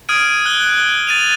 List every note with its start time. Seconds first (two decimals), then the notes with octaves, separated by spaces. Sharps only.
0.09 D#6 F6 G#6 D7 D#7
0.45 F#6 G7
1.07 A6 D#7 F7